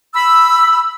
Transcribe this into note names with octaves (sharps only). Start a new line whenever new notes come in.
B5 E6